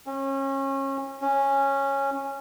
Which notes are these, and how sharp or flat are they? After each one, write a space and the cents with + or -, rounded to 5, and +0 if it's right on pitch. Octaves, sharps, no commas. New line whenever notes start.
C#4 -30
C#4 -10